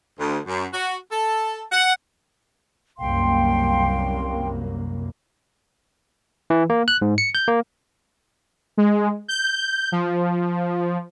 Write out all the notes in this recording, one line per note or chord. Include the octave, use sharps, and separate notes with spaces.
D2
F#2
F#4
A4
F#5
C2 F#2 A#3 F5 G5 C6
E3
A#3
F#6
G#2
C#7
G6
A#3
G#3
G6
F3